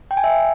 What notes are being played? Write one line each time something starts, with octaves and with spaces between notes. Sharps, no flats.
G5
G#5
E5